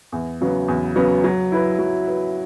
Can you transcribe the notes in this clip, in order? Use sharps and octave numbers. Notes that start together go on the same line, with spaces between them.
E2
C#3 F#3 B3
E2
C#3 F#3 B3
F#3
E4 B4
F#3
E4 B4